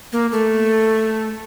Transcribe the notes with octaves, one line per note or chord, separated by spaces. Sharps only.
A#3
A3